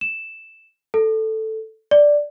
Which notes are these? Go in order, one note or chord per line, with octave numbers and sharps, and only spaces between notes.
E7
A4
D5